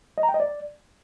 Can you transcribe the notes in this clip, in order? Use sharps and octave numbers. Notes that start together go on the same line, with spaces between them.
D#5
A#5
G5
D#5
D5